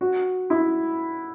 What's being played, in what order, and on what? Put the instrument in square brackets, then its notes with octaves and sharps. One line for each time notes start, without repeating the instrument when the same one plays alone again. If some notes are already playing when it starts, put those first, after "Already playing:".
[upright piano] F#4
E4